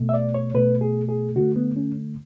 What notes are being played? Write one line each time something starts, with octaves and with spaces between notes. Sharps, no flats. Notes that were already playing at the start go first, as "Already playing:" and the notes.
Already playing: B2 A3
E5
D5
C#5
B2 A3 B4
G#4
G#4
D3 A3 F#4
B3
C#4